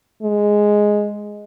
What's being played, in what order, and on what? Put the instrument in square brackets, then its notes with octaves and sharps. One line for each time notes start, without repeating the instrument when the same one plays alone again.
[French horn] G#3